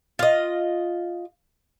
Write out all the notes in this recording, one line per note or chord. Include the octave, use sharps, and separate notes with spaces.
F4 D#5